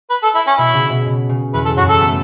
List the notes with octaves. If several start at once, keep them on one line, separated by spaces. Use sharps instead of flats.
B4
A4
E4
C#4
B2 B3 E4
C#3 C#4
B2 B3
B2
C#3
E2 E3 B4
A4
F#2 F#3 F#4
A4
B3
A3